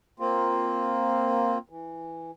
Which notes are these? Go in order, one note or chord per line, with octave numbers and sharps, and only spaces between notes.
A#3 C4 F4
E3